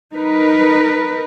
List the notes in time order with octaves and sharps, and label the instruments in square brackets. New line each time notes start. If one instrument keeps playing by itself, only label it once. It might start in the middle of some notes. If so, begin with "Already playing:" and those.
[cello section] D#4 A#4 B4